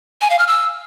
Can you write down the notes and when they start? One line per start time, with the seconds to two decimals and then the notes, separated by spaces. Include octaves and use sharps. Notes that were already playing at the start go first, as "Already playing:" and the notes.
0.21 G#5
0.30 F5
0.39 F6
0.48 E6